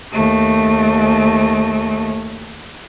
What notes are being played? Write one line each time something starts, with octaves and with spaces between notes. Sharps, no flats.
D#2 A3